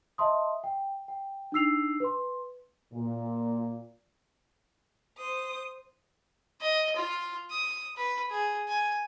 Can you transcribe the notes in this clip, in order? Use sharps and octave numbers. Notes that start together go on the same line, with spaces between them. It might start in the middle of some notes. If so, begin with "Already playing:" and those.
D#5 E5 A5 C6 D#6
G5
G5
D4 D#4 E6 C7 F7
B4 C6
A#2
C5 D#6
D#5
F4
D#6
B4
G#4
G#5